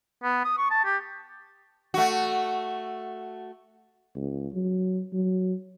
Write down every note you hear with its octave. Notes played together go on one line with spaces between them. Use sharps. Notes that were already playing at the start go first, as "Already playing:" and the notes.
B3
D#6
C#6
A5
G4
A3 F#4
C#2
F#3
F#3